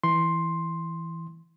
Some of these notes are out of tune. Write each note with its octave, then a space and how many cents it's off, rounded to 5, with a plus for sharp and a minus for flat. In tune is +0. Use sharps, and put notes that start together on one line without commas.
E3 +0 C6 +5